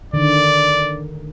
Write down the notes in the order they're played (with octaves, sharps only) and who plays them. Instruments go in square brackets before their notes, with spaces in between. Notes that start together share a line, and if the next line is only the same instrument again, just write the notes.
[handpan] D3 D#3 [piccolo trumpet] D5